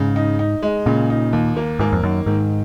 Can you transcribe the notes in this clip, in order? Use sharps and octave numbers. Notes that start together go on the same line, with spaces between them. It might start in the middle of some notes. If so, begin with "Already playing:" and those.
Already playing: G#2 C#3
D#4
D#4
G#3
A#2 C#3
D#4
D#2
A#3
G#2 A#3
F2
F#2 D#3
G#2 D#3